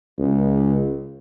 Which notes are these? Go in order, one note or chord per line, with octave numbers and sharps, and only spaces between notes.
C#2